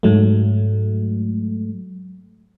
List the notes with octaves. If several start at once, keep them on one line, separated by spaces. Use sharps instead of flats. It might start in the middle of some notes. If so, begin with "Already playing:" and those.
G#2 F#3 A3